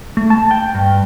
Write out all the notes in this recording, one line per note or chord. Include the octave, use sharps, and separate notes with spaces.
A3
A5
G5
G2